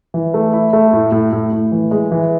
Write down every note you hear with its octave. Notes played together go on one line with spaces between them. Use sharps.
E3
A3
E4
A3
A2
A2
A2
A2
E3
G#3
E3